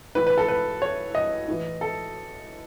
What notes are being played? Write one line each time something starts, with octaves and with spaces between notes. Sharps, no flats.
A2 E3 B4
B4
A4
B4
C#5
D#5
A2 E3
A4